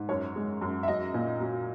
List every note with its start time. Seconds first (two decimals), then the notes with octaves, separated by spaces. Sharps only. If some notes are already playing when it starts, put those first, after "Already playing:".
Already playing: G#2
0.09 F#2 C#5
0.36 G#3
0.61 F#2
0.83 E5
0.88 F#3 D#5
1.14 A#2
1.40 F#3